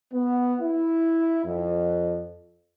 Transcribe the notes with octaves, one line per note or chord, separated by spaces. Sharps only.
B3
E4
F2